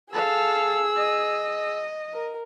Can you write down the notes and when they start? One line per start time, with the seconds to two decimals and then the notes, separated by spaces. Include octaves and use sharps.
0.13 G#4 A4 F5 E6
0.96 D#5
2.13 A#4